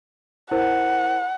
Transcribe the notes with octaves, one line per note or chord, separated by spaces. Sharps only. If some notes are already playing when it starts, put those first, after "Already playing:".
E4 A#4 C5 F#5